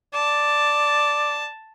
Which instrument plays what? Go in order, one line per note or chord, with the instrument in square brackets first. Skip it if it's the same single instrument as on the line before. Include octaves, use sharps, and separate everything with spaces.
[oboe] D5 [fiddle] A5